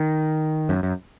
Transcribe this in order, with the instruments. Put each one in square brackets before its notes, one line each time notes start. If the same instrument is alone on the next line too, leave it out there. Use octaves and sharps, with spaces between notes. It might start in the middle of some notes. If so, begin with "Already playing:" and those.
Already playing: [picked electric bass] D#3
F#2
F#2